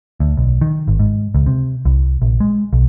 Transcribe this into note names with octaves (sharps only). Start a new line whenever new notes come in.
D2
B1
D#3
G#1
G#2
C#2
C3
C2
A#1
G#3
B1